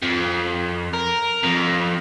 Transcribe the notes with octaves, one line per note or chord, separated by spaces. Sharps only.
F2
A#4
F2